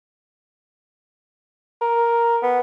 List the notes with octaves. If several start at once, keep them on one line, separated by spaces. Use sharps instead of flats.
A#4
B3